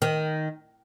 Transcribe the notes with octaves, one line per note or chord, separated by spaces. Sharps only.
D#3